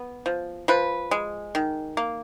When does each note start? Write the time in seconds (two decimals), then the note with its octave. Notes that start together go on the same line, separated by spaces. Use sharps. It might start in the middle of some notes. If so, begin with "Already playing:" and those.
Already playing: B3
0.26 F3
0.68 F3 B4
1.11 G#3
1.55 D#3
1.97 A#3